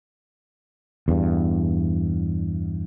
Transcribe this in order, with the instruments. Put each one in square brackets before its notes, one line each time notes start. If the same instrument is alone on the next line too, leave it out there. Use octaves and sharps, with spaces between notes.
[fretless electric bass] E2 G2